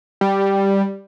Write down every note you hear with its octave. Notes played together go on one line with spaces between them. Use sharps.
G3